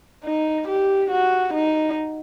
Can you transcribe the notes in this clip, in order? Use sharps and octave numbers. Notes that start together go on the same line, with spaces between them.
D#4
G4
F#4
D#4